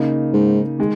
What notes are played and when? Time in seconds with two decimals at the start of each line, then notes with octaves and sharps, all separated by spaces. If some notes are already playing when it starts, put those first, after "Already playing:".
Already playing: C#3 A#3 D#4
0.33 G#2
0.78 D#3 G#3